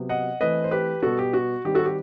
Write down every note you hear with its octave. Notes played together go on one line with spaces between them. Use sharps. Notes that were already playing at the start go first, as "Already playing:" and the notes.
Already playing: C3 F#3 B3
D#5 F#5
E3 A3 C4 B4 D#5
C5
G4 B4
B2 G3 B3 F#4 A4
G4
F#4
D#3 G3 C4 G4
F#4 A4
G4